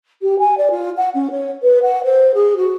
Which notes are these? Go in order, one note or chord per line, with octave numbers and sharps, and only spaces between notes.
G4
G#5
D5
F4
F#5
C#4
C#5
B4
F#5
C5
G#4
F#4